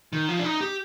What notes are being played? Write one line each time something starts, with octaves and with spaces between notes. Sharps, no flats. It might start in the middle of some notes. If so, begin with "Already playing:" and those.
D#3
F3
D4
D#4
G4